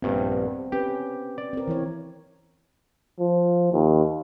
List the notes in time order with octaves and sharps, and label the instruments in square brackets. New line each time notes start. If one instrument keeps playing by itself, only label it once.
[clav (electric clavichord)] A#1 G2 [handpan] B3 C4
[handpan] B3 C#4 B4 [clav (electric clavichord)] G4
[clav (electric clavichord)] D5
[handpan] C4 A#4
E3 E4 C#5
[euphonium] F3
D#2